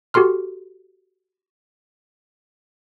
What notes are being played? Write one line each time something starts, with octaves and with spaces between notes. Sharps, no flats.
F#4 G4 A4 C6 F6